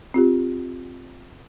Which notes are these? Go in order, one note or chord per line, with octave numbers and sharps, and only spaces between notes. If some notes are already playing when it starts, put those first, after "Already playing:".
C4 F4 G4